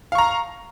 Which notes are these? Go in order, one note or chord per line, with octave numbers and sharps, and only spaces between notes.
F5 A#5 C#6